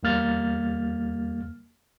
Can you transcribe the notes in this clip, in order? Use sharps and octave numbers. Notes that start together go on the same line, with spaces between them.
E2 G3 A#3 F6 A6